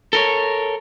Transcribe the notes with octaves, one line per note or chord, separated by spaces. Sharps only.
A4 A#4 C#5